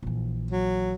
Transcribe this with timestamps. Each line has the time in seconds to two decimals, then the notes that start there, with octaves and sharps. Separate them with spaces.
0.03 A#1 E3
0.51 F#3